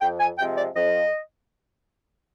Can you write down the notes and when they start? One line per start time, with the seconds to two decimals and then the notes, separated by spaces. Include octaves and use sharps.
0.02 F2 G5
0.20 G#5
0.39 C3 F3 G#3 C4 G5
0.57 D5
0.75 F2 D#5